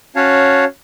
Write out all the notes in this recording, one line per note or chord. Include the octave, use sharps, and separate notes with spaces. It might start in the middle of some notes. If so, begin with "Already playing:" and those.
C#4 F#4 C#5 F5 A5